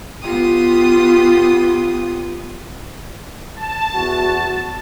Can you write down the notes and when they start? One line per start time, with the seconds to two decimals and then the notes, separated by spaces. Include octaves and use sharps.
0.22 B3 F4 G4 D#6
3.56 A5
3.96 E2 F#4